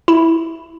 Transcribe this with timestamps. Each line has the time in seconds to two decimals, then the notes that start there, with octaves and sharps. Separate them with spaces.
0.08 E4